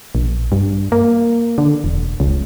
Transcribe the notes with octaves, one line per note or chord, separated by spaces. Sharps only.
A#1
G2
A#3
D3
E1
C#2